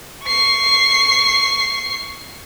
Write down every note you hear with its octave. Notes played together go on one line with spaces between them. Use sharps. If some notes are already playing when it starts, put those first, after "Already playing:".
C#6 C7